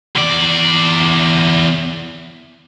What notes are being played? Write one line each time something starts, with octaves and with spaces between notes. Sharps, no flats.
E2 D5